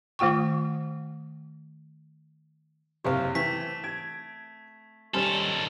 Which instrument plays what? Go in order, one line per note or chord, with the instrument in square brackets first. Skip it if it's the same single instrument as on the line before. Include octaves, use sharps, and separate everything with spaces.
[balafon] D#3 A3 F4 G5 C#6
[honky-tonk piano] F#1 C3 C5 [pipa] C#5 F5
[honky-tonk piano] E3 [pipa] A3 C4 [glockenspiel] B6
[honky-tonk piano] G#6 D7
[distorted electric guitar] D#3 A4 [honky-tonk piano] G3 [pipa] C#4 G#4 C5